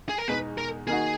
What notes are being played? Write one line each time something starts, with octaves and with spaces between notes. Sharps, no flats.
G#4
A#4
E2 B2 G#3 D#4 B4
A#4
D#3 A#3 D#4 F#4 G#4